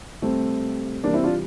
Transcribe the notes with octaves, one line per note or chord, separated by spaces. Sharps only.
C3 G3 A3 C4
C3 E3 G3 A#3 D4
C4 E4
D4 F4